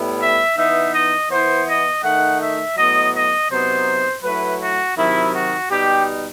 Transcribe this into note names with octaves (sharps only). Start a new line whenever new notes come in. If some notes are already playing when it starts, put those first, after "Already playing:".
Already playing: A2 G3 B3 E4
E5
E3 B3 D#4 E5
D#5
E3 B3 E4 C5
D#5
D#3 A3 D#4 F#5
E5
A2 F#3 B3 D#5
D#5
C3 F#3 B3 D#4 C5
F#3 A3 E4 B4
F#4
C3 D#3 F#3 E4
F#4
B2 G3 D#4 G4